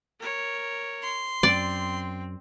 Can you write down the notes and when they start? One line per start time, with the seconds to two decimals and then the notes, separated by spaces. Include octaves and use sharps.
0.19 A#4 C#5
1.03 C6
1.43 F#2 C4 D5